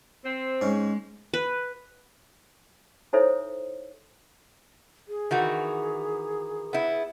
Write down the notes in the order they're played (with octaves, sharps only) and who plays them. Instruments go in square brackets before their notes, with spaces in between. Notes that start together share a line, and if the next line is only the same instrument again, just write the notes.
[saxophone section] C4
[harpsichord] G#2 C#4 [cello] G#3
[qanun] B4
[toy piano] D#4 E4 A4 C5 C#5 E5
[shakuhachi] G#4
[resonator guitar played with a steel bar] D#3 E3 F#4
B3 E4